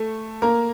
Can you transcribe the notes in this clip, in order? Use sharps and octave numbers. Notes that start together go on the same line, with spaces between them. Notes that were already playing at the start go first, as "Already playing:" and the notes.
Already playing: A3 A4
A#3 A#4